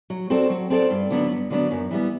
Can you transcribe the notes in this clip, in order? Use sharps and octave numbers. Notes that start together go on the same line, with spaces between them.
F#3
C4 F#4 A4 D5
F#3
C4 F#4 A4 D5
G2
D3 F#3 B3 D4
G2
D3 F#3 B3 D4
F#2
E3 G3 B3